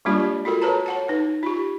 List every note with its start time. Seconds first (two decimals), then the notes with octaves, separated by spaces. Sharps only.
0.05 G3 G#3 A#3 D4 F4 G4
0.45 F4 F#4 A4 A#4
0.62 A4 B4 C#5 A5 A#5
0.86 C#5 F#5 A5
1.08 D#4 B4
1.43 F4 G4